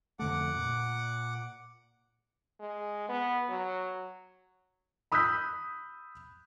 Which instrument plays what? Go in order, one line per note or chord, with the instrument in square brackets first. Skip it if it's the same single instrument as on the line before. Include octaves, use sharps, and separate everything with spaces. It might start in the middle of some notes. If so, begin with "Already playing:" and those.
[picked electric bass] F2 D3 A3 [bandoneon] F#5 D6
[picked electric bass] A#2
[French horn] G#3
B3
F#3
[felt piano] B5 D#6 E6 F#6 G6 B6